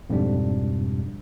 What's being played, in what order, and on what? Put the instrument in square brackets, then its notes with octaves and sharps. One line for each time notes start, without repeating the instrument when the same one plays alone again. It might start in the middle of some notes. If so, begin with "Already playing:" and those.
[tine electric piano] F2 G#2 B2 G3 D4